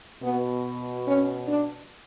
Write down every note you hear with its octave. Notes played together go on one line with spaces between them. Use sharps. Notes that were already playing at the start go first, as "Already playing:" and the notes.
B2 B3
C#4
D4